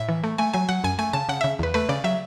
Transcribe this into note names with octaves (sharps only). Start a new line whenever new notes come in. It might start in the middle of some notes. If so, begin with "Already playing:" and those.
Already playing: A2 E5
E3
A3
A3 G#5
F#3 G#5
F#3 F#5
F#2 G#5
A3 G#5
C#3 A5
C#3 F#5
C#3 E5
E2 B4
A3 B4
C#3 D5
F#3 E5